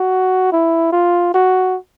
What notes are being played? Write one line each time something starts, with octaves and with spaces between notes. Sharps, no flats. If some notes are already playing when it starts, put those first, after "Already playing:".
Already playing: F#4
E4
F4
F#4